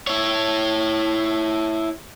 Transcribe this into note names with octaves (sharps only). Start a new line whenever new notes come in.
E4 C#5